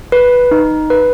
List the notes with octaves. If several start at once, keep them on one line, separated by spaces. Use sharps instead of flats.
B4
D#4
B4